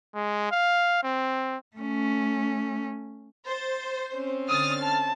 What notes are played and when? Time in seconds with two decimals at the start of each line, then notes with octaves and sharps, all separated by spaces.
0.15 G#3
0.51 F5
1.03 C4
1.77 A3 C#4
3.46 C5 A6
4.13 C4 C#4
4.49 D3 D#6 F6 A6
4.83 A5